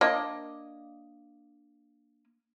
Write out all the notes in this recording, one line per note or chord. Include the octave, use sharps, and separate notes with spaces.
A#3 D4 D#5